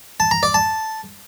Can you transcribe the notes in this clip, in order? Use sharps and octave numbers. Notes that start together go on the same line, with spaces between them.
A5
A#5
D5
A5